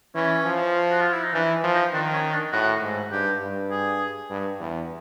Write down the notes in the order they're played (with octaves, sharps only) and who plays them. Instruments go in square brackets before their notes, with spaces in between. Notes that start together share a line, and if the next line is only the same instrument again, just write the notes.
[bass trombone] E3 [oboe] C#4
[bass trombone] F3
[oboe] F#4
F4
E4
D#4
[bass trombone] E3 [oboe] D4
[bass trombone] F3
[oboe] D#4
[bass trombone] D#3 [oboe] D4
[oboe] C#4
D4
[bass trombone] A2 [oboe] F#4
[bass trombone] G#2
[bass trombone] G2 [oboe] G4
[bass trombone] G2
[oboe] G#4
[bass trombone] G2
E2